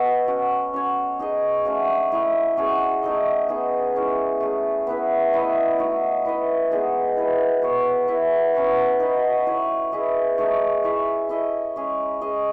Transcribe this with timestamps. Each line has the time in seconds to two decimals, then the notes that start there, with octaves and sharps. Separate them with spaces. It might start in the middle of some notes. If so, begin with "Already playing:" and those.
Already playing: B3 F#4 A4 D#5
0.28 F#3 C#4 F#4
0.74 C#4 F#4 C#5
1.19 D#4 G#4 D#5
1.65 F#3 A3 C#4
2.12 A3 E4 A4 D#5
2.57 F#3 C#4 G#4 C#5
3.03 A3 D#4 A4 D#5
3.48 B3 D#4 G#4
3.95 G#3 C#4 E4
4.40 A3 C#4 G#4
4.87 B3 E4 B4
5.33 A3 E4 B4 D#5
5.78 A3 D#4 F#4
6.25 E4 B4 D#5
6.71 G#3 B3 D#4 G#4
7.16 E4 B4 D#5
7.62 B3 F#4 C#5
8.08 E4 B4 E5
8.54 F#3 C#4 E4 B4
9.00 D#4 F#4 B4 D#5
9.47 E4 A4 C#5
9.92 E4 G#4 B4 D#5
10.38 A3 D#4 G#4 C#5
10.84 E4 G#4 C#5 E5
11.29 E4 A4 D#5
11.76 G#3 C#4 G#4 C#5
12.21 C#4 G#4 D#5